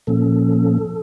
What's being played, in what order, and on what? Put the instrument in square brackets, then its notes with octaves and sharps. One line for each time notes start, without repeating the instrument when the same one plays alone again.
[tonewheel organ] A#2 F3 A#3 C#4 A4